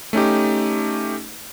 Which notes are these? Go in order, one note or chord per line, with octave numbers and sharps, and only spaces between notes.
A3 C#4 D#4 G4